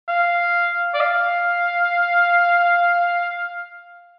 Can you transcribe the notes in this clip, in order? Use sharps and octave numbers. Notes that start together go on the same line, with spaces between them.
F5
D5
F5